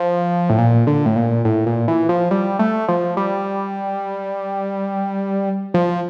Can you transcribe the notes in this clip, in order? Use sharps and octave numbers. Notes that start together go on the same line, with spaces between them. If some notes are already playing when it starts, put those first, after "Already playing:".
Already playing: F3
A2
A#2
D3
A2
A#2
A2
A#2
E3
F3
G3
A3
F3
G3
F3